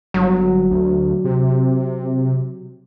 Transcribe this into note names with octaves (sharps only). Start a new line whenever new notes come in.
G1 F#3
D2
C3